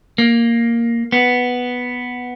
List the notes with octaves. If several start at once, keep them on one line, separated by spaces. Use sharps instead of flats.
A#3
B3